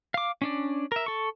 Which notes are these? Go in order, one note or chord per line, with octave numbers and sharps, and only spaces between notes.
F5 D6
C#4 D4 D5
A#4 E5
A4 C#6